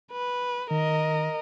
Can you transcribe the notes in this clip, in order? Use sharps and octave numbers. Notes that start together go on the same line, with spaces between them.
B4
D#3 A#4 D#5